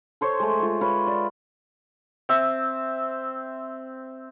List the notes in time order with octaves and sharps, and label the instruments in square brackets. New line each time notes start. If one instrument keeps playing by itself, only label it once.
[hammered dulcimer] A4 C5 C#5
G#3 A3
G#3 F4
B4 C#5 F5
D5
[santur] C4 E5